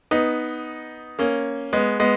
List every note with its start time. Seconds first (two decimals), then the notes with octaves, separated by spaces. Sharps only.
0.11 B3 D#4
1.19 A#3 C#4
1.73 G#3 B3
2.00 G#3 B3